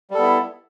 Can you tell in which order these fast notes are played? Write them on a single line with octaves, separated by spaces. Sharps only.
G3 A4 B3 E4